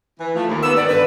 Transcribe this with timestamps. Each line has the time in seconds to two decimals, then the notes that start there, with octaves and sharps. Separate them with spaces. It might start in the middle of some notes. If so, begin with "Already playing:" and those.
0.20 E3
0.35 F3 A3
0.48 D#2
0.63 B3 E6
0.76 G#2 D#3 B3 D5
0.88 G2 D3 B4